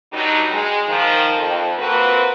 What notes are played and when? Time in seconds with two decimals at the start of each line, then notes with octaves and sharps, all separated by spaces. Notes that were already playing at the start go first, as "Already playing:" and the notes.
0.12 G2 F#3 G3 D#4
0.53 G#3
0.88 D#3 F3
1.38 F2
1.79 A#3 C4 F#4 B4